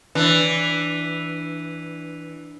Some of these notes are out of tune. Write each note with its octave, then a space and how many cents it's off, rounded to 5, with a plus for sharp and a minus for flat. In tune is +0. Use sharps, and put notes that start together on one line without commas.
E3 -5 D4 +0